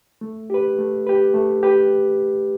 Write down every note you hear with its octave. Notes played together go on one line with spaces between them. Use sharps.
A3
G4 B4
A3
G4 B4
A3
G4 B4